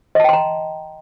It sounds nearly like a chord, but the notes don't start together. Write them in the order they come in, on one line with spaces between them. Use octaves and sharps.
D#5 A5 G5 C6 A#5